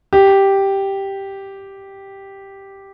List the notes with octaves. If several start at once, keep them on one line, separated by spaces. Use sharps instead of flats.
G4